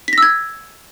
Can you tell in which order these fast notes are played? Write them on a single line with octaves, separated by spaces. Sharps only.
B6 A#6 E6 G#6